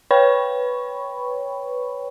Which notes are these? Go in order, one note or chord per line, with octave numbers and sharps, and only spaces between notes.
B4 C#5 G5 B5 C#6